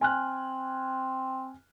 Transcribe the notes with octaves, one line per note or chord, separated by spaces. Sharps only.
C4 G#5 F6 F#6